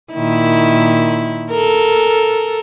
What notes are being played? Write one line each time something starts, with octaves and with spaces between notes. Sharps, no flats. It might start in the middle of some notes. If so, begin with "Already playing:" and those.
A#2 D#3 E4
A4 A#4